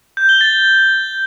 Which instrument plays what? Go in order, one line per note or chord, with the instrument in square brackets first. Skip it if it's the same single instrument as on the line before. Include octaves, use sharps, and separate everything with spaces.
[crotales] G6
G7
A6